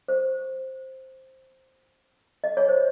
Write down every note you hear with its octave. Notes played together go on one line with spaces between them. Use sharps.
C5
D#5
C#5
C5